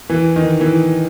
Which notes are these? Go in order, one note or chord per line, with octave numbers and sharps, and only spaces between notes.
E3
D#3
E3